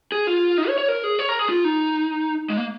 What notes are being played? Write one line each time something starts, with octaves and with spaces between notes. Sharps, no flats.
G#4
F4
D#4
C#5
C#5
A#4
G#4
C#5
A#4
G#4
F4
D#4
G#3
A#3